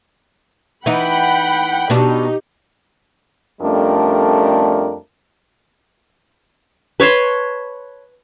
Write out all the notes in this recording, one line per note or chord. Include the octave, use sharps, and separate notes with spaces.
E3 D#4 F#5 G5 B5
B2 D4 D#4 G4
F2 G3 A3 C#4 D4 A#4
B4 C#5 A5 C6